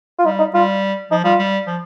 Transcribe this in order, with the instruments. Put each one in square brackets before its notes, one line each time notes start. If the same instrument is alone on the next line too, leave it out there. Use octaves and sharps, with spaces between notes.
[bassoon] F4
[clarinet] G3 [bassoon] D#4
[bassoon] D#4
[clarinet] G3 [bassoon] F4
[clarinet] F3 [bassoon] D#4
[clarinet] G3 [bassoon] F4
[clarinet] G3
F3